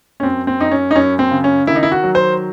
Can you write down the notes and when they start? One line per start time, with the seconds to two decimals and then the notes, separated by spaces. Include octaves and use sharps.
0.20 C#4
0.23 F#2 C4
0.47 C4
0.60 F#2 D#4
0.72 C#4
0.91 D#4
0.95 F#2 C#4
1.19 C4
1.32 C#3
1.44 C#4
1.67 D#3 E4
1.76 D#4
1.83 E4
1.92 F#4
2.04 F#3
2.15 C5